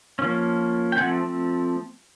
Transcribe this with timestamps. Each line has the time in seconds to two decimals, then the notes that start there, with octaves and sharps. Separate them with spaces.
0.19 F3 A#3 C#4
0.92 G5
0.97 F3 A3 C4 F#5 G#5